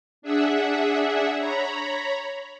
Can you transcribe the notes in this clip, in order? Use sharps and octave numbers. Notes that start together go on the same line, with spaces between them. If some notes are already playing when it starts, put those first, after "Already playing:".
D4 G#4 E5 F#5
C#5 A#5 B5